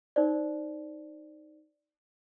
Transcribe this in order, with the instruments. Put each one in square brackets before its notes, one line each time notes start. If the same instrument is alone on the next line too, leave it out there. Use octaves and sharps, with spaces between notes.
[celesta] D#4 C5 D5